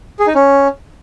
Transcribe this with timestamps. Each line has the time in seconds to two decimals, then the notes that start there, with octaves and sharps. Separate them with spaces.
0.19 G#4
0.27 D#4
0.35 C#4